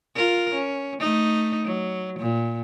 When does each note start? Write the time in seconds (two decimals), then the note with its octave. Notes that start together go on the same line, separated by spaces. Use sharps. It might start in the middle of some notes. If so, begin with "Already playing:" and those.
0.16 F4 A#4
0.55 C#4
1.00 A3 D#4
1.65 F#3
2.19 A#2